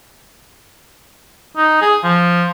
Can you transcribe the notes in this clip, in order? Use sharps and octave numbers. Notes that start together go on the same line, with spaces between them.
D#4
G#4
F3